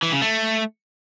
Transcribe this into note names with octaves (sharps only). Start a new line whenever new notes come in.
E3
C#3
A3